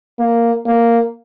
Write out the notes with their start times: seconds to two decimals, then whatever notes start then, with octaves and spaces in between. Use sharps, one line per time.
0.19 A#3
0.67 A#3